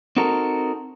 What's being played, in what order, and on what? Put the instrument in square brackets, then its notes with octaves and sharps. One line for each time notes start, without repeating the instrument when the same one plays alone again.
[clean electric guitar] C4 D#4 F#4 A4 A#4